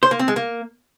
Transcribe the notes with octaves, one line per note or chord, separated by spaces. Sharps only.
C5
A#3
C4
G#3
A#3